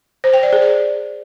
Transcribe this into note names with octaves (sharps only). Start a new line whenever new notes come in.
C5
G5
D5
G#4
D5